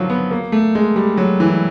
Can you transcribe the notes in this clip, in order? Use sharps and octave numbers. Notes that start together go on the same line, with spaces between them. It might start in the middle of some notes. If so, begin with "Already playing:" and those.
Already playing: D3 D#3 F3 F#3
B3
A#3
A3
G#3
G3
F#3
E3